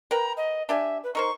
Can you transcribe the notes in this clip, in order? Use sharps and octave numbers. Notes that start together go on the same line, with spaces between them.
A#4 B4 G5 A#5
D#5
D4 G4 E5 G#5
B4
D#4 A#4 C5 C#6